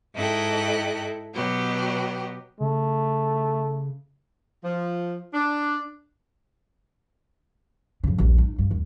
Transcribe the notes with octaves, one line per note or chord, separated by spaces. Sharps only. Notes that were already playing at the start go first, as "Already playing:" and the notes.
G#2 E4 A4 D#5 G5 F#6
B2 F#3 B3 G4
C#3 A3
F3
D4
F2 C#3
A#1 D#2
D#4
G2
D#2